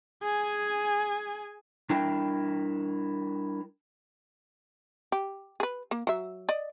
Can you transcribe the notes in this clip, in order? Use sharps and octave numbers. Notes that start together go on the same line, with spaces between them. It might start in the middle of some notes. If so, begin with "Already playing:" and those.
G#4 G#5
G3 D4 E4 A#4 G5
G4
G#4 B4
A#3
F#3 E5
D5 D#5